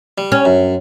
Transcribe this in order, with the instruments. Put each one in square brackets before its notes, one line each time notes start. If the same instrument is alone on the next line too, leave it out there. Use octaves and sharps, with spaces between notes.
[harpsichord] G3
[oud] C#4
[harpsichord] F#2